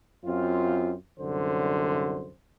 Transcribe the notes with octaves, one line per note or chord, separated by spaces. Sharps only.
F#2 C4 F4
C2 F#2 D3 C5